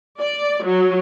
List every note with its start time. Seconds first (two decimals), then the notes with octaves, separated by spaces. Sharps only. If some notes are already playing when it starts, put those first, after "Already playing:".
0.21 D5
0.65 F#3